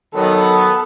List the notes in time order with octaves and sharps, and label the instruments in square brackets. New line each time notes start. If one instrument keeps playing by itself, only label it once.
[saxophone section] D#3 F#3 [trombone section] B3 [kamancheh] A4